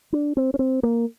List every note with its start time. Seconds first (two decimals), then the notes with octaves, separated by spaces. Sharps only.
0.13 D4
0.37 C4
0.54 C#4
0.59 C4
0.83 A#3